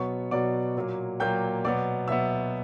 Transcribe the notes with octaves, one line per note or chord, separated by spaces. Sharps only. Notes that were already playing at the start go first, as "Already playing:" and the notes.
Already playing: B2 F#3 B3 C#5 C#6
B2 F#3 B3 D5 D6
A#2 F#3 A#3
A#2 F#3 A#3 G5 G6
B2 F#3 B3 D5 D6
B2 F#3 B3 E5 E6